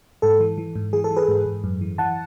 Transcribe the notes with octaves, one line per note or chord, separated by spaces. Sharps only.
G#2 A4
E3
E3
G#2
E3 G#4
A4
E3
G#4 B4
G#2
G#2
F#2
E3
E3 F#5 A5